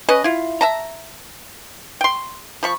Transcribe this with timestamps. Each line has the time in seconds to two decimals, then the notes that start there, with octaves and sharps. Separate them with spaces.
0.09 C#4 B4 D#5
0.24 E4 F4
0.61 E5 A5 A#5
2.01 G5 C6
2.63 F3 B5 C#6